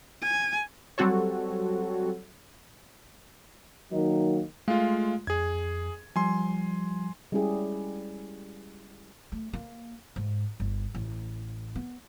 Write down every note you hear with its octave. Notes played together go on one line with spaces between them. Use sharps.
G#5
F#3 G3 C4 F#4 A4 C#5
D#3 F#3 A#3 D#4
G#3 A3 F4 F5
F2 G#4 G#6
F3 G3 G#5 C6
G3 G#3 C#4 E4 G4 G#4
A3
A#3
G#2
G1
A1
B3